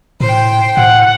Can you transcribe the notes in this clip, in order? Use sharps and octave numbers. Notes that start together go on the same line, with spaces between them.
A2 C5 G5
A2 F#5